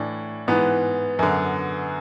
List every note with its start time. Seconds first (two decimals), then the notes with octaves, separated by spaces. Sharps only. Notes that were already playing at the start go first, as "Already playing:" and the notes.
Already playing: A2 E3 D4
0.48 G#2 E3 B3
1.19 F#2 D3